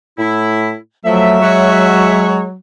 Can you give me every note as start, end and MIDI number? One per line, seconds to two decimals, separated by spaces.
0.19 0.75 45
0.19 0.76 64
1.05 1.40 53
1.05 2.56 54
1.05 1.38 57
1.05 2.28 76
1.42 2.46 56
1.42 2.46 66
1.42 2.46 73